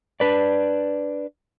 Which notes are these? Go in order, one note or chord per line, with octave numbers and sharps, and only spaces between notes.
D4 B4 D5